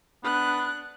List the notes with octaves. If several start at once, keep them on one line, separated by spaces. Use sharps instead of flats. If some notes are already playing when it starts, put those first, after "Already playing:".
B3 D4 F#6